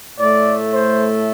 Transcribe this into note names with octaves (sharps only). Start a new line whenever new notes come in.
A2 A3 D5
C5